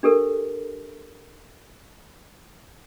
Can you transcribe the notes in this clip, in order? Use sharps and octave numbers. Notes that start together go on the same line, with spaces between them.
D4 G4 A4 A#4